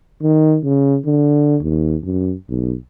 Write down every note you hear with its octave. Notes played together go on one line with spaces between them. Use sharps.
D#3
C#3
D3
D#2
F#2
B1